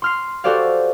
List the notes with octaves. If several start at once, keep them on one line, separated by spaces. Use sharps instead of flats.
C6 F6 C7
F#4 G4 A4 C5 D5 F5